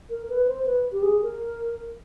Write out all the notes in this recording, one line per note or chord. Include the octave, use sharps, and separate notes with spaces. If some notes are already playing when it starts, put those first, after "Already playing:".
A#4
B4
C5
B4
G4
G#4
A#4